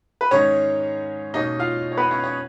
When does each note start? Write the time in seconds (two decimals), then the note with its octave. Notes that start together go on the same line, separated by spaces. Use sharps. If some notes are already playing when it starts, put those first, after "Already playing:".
0.21 B4
0.31 G#2 D#3 G#3 C#4 D#4 C#5
1.34 B2 A#3 C#4 D#4 D#5
1.60 F4 F5
1.92 C#5
1.97 B3 B4
2.11 C#4 C#5
2.24 C#4 C#5